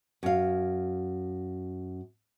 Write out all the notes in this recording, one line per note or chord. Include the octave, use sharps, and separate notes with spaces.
F#2 F5